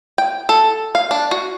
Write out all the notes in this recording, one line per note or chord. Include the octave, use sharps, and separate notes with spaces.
G5
A4
F5
D4
F#4